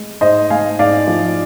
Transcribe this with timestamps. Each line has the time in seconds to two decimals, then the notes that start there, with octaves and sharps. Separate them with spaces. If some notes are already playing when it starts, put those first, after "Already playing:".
Already playing: G#3
0.21 G#2 C5 D#5
0.50 G#3 F5 G#5
0.79 G#2 D5 F5
1.07 F3